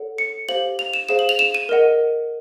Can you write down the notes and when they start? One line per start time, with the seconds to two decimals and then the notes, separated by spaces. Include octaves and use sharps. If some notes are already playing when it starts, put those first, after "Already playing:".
Already playing: A4 C#5 F#5
0.18 C#7
0.49 G4 C5 F5 F#7
0.79 F7
0.94 E7
1.09 G#4 C5 F5 E7
1.19 F#7
1.29 F7
1.39 E7
1.54 D#7
1.69 A#4 D#5 F#5